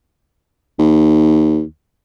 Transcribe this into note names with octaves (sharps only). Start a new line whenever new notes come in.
D#2